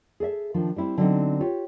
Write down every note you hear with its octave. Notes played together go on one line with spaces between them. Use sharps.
G#4 A4 D5 E5
D#3 F3 D4
G3 C4 E4
D3 F#3 G3 B3 C4 D#4
F4 G4 C#5